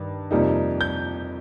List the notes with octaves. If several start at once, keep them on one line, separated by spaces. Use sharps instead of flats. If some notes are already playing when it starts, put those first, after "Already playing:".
Already playing: G2 D#3
F2 C3 G3 A#3 D#4
G6